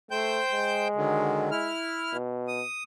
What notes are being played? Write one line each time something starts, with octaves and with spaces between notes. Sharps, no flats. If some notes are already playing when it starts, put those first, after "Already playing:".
A3 C5 G5 G6
G#3
D3 D#3 F#3
E4 F6
B2
D#6